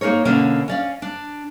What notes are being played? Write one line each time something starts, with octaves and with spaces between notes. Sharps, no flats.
A#3 D#4 G#4 A#4 C#5
B2 D3 A#3 C#4
C#4 D5 F5
D4